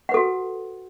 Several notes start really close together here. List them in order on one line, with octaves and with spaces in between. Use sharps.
F#5 B4 A4 F#4